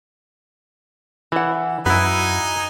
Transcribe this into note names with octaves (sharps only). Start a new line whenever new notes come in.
E3 E4 F#5
F#2 F#3 D#4 E4 F#4 B4 G#5